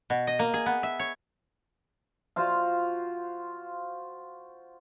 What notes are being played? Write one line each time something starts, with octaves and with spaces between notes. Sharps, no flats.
B2
D#5
A#3
G#4
B3
E5
C#5
F4 F#4 C5 F5